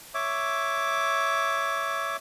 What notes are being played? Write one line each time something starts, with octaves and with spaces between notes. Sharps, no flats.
C#5 E5 D6